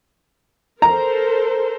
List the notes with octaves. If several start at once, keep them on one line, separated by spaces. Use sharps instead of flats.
A4 A#4 C5 A#5